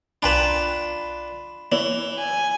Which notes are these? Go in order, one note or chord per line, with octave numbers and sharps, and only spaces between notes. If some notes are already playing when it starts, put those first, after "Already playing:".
B1 D4 F4 B4 G5 A#5 B5 E7
E3 A#3 E4 C#5 F#7
G#5